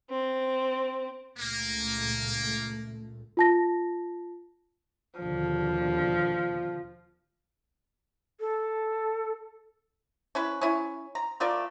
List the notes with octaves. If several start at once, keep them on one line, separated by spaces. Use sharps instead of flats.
C4
C#2 A#2 A3 A#3
F4 A5 A#6
D#2 B2 D3 F3
A4
C#4 E4 B4
C#4 E4
A#5
A3 F4 A#4 D5